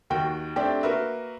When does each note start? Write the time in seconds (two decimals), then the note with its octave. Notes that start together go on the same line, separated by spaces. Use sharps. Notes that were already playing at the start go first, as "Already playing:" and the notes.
0.10 D#2 D#3 F#4 G5
0.56 A3 C4 D4 G4 D5
0.83 A#3 F#4 A#4 B4 E5